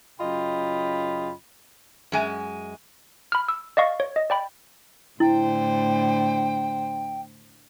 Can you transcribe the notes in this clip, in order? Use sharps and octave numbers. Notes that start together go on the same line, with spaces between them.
F#2 C#3 F4 D#5 G5 B5
F#2 G#3 G#5
B5 F6
E6
D5 D#5 F5 C#6
C#5
D#5
D5 G5 B5
A2 D3 E4 C5 G5